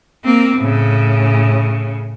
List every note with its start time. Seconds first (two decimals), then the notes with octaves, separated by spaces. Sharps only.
0.25 A#3 C4
0.58 A2 C#3